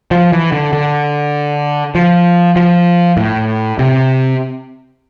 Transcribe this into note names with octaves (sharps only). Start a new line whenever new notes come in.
F3
E3
D3
D3
F3
F3
A2
C3